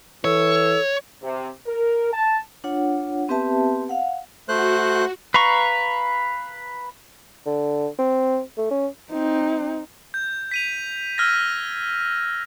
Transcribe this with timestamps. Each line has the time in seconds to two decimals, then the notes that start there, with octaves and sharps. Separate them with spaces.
0.25 E3 A4 C#5 E6
1.22 C3
1.66 A#4
2.13 A5
2.64 D4 F4 C#5 F#5
3.29 B3 C4 G4 B4 E5 A5
3.89 F5 F#5
4.49 A3 F#4 C5 F#6
5.34 B4 F5 A#5 C#6
7.46 D3
7.99 C4
8.58 A3
8.71 C#4
9.12 C4 D#4
10.14 G6
10.51 B6 D#7 F7
11.18 E6 F6 G#6 A#6